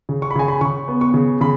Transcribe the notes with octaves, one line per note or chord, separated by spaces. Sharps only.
C#3
C#6
B5
C#3 G#5
B5
C#3 C#6
B3
C#6
C#3
C#3 B5